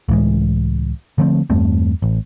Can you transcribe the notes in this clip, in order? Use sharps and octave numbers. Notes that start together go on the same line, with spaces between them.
C#2 A2 E3 G#3
D3 F3 A3 C4
E2 G2 A3 C4
A1